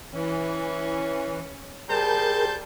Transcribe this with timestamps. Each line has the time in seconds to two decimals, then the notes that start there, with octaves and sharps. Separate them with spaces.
0.13 E3 C#4
1.89 G3 G#4 A#4 C5 A5 G6